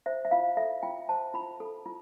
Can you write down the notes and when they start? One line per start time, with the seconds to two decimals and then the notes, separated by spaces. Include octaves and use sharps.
0.06 C5 E5
0.25 E5
0.31 F4 F5
0.57 A4 E5
0.83 F4 G5
1.09 C5 A5
1.34 F4 B5
1.60 A4
1.86 F4